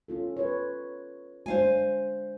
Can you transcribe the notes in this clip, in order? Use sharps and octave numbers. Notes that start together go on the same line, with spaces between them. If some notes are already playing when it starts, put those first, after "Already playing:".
C#4 F4 A4
B4 C#5
G#3 D4 C5 F5 G#5